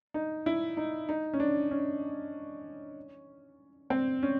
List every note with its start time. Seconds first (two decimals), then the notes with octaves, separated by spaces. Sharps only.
0.14 D#4
0.46 E4
0.77 D#4
1.09 D#4
1.33 C#4
1.40 D4
1.71 C#4
3.90 C4
4.23 C#4